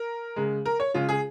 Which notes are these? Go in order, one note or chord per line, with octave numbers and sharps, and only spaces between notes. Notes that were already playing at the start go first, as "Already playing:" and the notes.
Already playing: A#4
C#3 G#3
A#4
C#5
C#3 G#3 F4
G#4